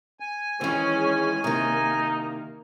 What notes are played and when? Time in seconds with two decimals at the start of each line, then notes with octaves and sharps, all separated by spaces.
0.20 G#5
0.61 D#3 E3 G#3 C#4 G#4
1.44 C3 D#3 A#3 D#4